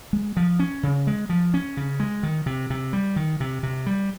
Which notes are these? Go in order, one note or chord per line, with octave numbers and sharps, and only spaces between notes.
G#3
F3
C#4
C#3
G#3
F3
C#4
C#3
G#3
D#3
C3
C3
G3
D#3
C3
C3
G3